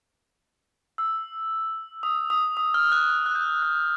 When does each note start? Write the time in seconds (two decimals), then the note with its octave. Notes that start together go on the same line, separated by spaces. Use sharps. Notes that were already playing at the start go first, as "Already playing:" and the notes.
0.98 E6
2.03 D#6
2.30 D#6
2.57 D#6
2.74 F6
2.92 F#6
3.09 F#6
3.26 F#6
3.35 G6
3.63 F#6